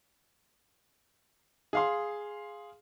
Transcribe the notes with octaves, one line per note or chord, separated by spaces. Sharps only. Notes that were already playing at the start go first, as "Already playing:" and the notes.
G#4 F5 C6